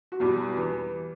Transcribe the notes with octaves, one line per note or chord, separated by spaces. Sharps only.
F#4
E2 B2 G3
E3